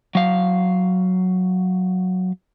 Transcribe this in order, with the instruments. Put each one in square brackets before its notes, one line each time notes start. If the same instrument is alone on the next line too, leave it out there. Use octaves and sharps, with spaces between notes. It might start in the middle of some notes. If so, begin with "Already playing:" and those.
[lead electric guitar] F#3 F5